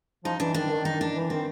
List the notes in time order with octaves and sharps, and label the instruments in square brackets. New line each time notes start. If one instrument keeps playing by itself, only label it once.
[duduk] F3 [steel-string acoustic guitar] D#4
[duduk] E3 [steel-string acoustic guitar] D4
[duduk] D#3 [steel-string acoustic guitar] D4
[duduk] D#3
[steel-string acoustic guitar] D#4
D4
[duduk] E3
[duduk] D#3 [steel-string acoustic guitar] C4